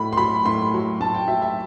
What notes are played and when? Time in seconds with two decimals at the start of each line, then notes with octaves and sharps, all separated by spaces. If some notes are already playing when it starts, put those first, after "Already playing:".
Already playing: A2 F#3 B5
0.13 C6
0.17 F#3 B5
0.45 A2 C6
0.74 F#3
1.00 A2 A5
1.15 G5
1.28 F#3 E5
1.42 E5